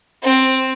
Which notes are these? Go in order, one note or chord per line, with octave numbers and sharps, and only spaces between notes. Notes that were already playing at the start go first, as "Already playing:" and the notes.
C4